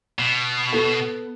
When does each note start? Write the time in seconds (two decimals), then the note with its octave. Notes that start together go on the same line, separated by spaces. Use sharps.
0.19 B2
0.72 B3 A4